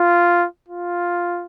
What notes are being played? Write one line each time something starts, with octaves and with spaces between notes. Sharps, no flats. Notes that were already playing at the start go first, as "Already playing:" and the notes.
Already playing: F4
F4